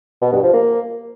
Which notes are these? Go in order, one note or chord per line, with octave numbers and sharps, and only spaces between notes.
B2
G2
F3
A#3